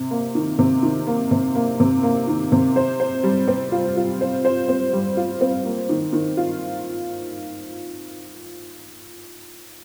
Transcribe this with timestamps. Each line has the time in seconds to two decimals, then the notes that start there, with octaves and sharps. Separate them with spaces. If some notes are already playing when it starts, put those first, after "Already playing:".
Already playing: C3
0.11 A#3
0.35 D#3
0.59 C3
0.83 D#3
1.07 A#3
1.31 C3
1.55 A#3
1.80 C3
2.03 A#3
2.28 D#3
2.52 C3
2.76 C5
3.00 C5
3.24 G3
3.48 C4
3.72 F4
3.97 F4
4.21 C5
4.45 C5
4.69 C4
4.93 G3
5.17 F4
5.41 C4
5.65 A#3
5.89 D#3
6.13 D#3
6.37 F4